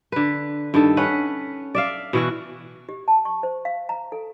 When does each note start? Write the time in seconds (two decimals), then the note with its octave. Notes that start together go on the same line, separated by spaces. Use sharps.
0.12 D3 B4
0.74 G2 D#3 A4
0.97 C#4 B4 F#5
1.75 D5 E5 F5
2.13 B2 E3 F#4
2.89 G4
3.08 A5
3.25 C#6
3.43 C5
3.65 F5
3.89 A#5
4.12 A4